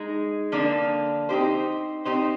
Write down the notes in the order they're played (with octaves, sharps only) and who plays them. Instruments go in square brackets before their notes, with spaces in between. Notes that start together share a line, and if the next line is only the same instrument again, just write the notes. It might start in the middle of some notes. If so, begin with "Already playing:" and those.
Already playing: [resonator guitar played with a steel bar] G#3 D#4 G#4
D3 F3 A#3 D4
C4 D#4 G4 C5
C4 D#4 G4 C5